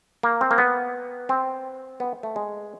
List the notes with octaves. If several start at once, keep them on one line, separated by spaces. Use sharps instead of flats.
A#3
C4
A#3
B3
C4
B3
A3
G#3